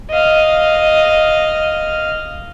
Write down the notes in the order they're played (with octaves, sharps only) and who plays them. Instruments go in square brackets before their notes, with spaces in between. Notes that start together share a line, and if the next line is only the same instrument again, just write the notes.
[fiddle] D#5 F5